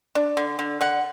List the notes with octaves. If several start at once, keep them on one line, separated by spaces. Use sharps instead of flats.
D4
D3
D3
D3 F#5